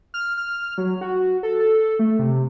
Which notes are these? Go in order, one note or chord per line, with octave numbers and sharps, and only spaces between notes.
F6
F6
F#3
F#4
A4
A4
A3
C3